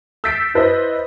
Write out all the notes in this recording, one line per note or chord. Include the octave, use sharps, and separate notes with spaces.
E6 G6 A6 B6 C7 D7
E4 B4 C5 D#5